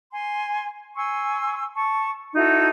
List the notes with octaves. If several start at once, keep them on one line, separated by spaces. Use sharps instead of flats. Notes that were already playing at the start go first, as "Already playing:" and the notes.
G#5 C6
G#5 C6 C#6 E6
A5 C#6
D#4 E4 F#4 A4